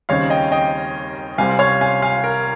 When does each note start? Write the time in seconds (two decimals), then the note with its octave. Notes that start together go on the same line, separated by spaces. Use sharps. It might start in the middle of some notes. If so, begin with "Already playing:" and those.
0.09 D#2 C#3 G3 C4 D#4 C#5 F5
0.30 D#5 G5
0.52 D#5 G5
1.38 C2 C3 G3 C4 F5 G#5
1.59 C#5 F5
1.81 F5 G#5
2.02 F5 G#5
2.24 A#4